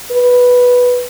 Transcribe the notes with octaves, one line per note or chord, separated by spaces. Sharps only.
B4